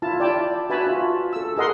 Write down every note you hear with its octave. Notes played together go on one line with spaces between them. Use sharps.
E4 F4 A5
D5 G5 A5
F#4 B4 E5 G#5 A5 B5
F4
A4 E6
G#4 A#4 D#5 F#5 C6